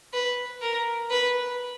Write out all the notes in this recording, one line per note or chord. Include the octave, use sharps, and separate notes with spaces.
B4
A#4
B4